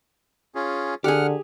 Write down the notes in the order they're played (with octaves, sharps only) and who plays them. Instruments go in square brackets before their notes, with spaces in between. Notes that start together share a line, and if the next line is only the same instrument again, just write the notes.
[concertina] C#4 F4 G#4
[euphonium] D3 [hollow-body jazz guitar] G4 G#4 [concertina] F#5 F6